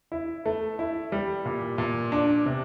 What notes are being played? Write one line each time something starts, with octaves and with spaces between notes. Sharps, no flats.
E4
A3
E4
G3
A#2
A#2
D4
C3